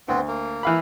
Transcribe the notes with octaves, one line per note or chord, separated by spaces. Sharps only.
D2 B3 C4
A#3
E3 F5 B5